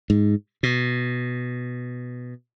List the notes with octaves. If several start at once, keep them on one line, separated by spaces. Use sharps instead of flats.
G#2
B2